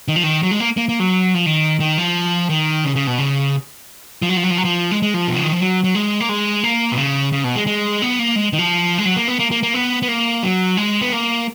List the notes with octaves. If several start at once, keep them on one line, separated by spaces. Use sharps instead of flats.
D#3
F3
D#3
F#3
G#3
A#3
A#3
A#3
F#3
F3
D#3
D#3
F3
D#3
C#3
C#3
B2
C#3
F3
F#3
F3
F#3
F3
F#3
F3
G#3
G#3
F3
B2
C#3
D#3
F3
F#3
F#3
G#3
A#3
G#3
A#3
B2
C#3
C#3
B2
G#3
G#3
B3
A#3
G#3
D#3
F3
G#3
F#3
A#3
B3
A#3
A#3
A#3
B3
B3
A#3
F#3
G#3
B3
A#3